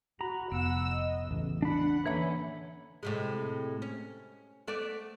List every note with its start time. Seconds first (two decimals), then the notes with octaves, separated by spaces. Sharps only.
0.21 F#4 A#5 B5
0.52 F1 B3 F#5 E6
0.90 D#5
1.31 A1 E2 C#3
1.62 D4 F#5 B5
2.06 D3 E3 A#3 C#4 B4 C#5 E5 B5
3.03 A2 C3 G#3
3.82 C#4
4.68 A3 B3 D5